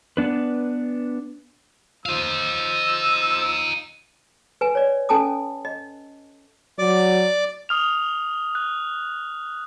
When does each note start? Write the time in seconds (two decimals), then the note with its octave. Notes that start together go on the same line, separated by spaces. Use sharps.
0.17 B3 D4 B4
2.06 F3 D#4 F5 E6
4.61 B4 G#5
4.75 C#5 D5
5.09 C#4 A4 G#5 A5 D#6
5.65 D#5
6.79 F#3 D5 D6
7.69 D#6 F6 F7
8.55 F#6